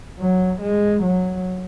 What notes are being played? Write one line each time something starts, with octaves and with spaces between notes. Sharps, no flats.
F#3
G#3
F#3